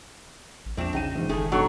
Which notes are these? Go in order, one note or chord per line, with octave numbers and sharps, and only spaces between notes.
A1
A#1 E2 C4 D4 E7
B1 C#3 D#4 G5 D#7
A#1 G#2 E3
F#1 A2 D#3 A3 G#4
B1 G2 F#3 D4 A4 C#5